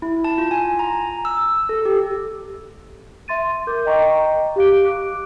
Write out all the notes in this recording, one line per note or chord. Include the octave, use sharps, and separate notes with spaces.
E4
A5
F4
G#5
A#5
E6
A4
G4
E5 C6 A6 D#7
A#4 D6 G6
D#5 G5 A#5 C#6
G4 F5 D7
D6 F#6